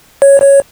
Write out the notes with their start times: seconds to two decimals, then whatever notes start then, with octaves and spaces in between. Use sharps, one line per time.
0.22 C#5
0.42 C#5